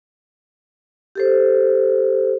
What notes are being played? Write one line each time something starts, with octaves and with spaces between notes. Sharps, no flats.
G4 A4 C5